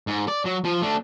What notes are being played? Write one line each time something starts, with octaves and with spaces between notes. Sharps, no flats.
G#2
D5
F#3
F3
A3 D4